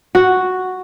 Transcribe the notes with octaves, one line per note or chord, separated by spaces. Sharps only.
F#4